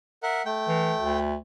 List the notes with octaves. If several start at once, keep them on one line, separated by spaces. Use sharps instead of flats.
A#4 E5 F#5
A3 G5
E3
D2